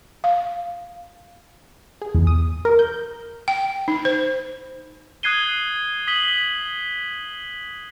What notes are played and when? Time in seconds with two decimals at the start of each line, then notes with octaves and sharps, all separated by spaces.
0.24 F5
2.02 G#4
2.15 E2
2.27 D#6
2.65 A#4
2.79 G6
3.48 G5
3.88 D#4
4.05 C5
5.23 D#6 F#6 G#6 C7 D#7 G7
6.07 D#6 B6 F#7 G7